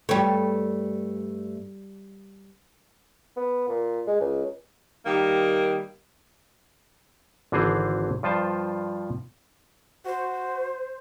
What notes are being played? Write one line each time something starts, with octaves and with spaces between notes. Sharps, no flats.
G2 G3 A3 C#5
B3
A#2
G#3
C#2
D#3 G3 A#3
G#1 D3 E3 C4 G#4 C5
G2 F3 F4 C5 A5
F#4 C5